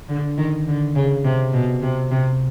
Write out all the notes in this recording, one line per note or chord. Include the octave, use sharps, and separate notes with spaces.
D3
D#3
D3
C#3
C3
B2
C3
C3